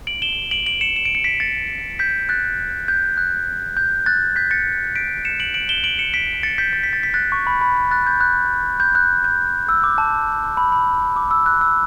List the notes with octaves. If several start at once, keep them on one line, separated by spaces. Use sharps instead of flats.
D7 F#7
E7 G7
D7 F#7
D7 F#7
C#7 E7
E7
D7
C#7
B6 D7
A6 C#7
G6 B6
F#6 A6
G6
F#6
G6
F#6 A6
G6 B6
A6 C#7
B6 D7
C#7 E7
D7 F#7
D7 F#7
E7 G7
D7 F#7
C#7 E7
B6 D7
A6 C#7
G6 B6
A6
B6
A6
B6
F#6 A6
C#6
B5
B5
F#6 A6
G6
F#6
G6
F#6
G6
E6
D6
A5
B5
B5
D6
E6
F#6
E6